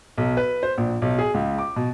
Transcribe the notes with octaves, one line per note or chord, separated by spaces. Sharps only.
B1
B4
C5
A#1
B1
G#4
C#2
D6
B2